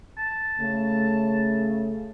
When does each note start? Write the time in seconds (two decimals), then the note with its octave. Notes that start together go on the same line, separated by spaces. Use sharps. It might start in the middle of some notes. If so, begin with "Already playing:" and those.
0.18 A5
0.59 C#3 A3